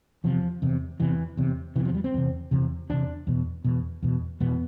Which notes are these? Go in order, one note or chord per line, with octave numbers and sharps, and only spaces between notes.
E2 C3 F3
E2 C3
E2 C3 E3
E2 C3
E2 C3 E3
F3
G3
C4
E2 C3
E2 C3
E2 C3 D4
E2 B2
E2 B2
E2 B2
E2 B2 B3